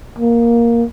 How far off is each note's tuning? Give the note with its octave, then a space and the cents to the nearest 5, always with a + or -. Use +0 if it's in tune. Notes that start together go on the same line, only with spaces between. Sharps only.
A#3 +5